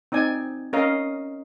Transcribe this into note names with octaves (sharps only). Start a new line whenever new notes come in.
C4 D#4 D5 G#5
C#4 A#4 D#5 F5